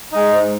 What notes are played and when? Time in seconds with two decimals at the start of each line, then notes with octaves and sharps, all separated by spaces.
0.12 G#3 D#4
0.32 G#2